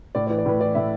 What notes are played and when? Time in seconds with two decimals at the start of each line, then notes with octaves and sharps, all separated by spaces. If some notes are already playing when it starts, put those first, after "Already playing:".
0.15 A2 D5
0.27 D5
0.30 E3
0.38 D5
0.46 A2 B4
0.60 E3 D5
0.75 A2 E5